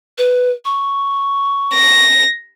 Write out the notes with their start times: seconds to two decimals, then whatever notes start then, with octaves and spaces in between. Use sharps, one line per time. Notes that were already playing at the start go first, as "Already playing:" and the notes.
0.18 B4
0.65 C#6
1.74 A#6